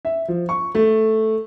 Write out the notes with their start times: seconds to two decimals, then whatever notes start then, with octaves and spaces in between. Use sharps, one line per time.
0.05 E5
0.28 F3
0.49 C#6
0.75 A3